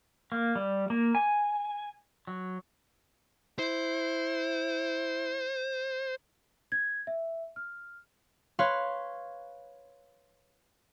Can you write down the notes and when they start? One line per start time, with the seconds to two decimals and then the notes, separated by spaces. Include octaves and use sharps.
0.32 A#3
0.56 G3
0.90 A#3
1.15 G#5
2.27 F#3
3.59 E4 C5
6.72 G#6
7.07 E5
7.56 F6
8.59 B4 C#5 F5 C6